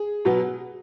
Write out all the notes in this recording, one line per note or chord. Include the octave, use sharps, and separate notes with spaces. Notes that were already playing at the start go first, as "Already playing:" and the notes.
Already playing: G#4
B2 F#3 B3